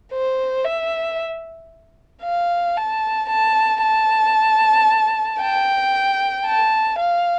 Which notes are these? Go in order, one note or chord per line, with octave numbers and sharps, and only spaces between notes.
C5
E5
F5
A5
A5
A5
G5
A5
F5